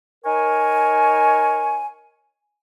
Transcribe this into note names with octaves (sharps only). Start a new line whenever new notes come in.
D#4 A#4 C#5 G#5